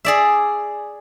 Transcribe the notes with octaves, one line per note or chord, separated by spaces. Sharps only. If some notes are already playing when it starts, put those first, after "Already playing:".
G#4 D5 E5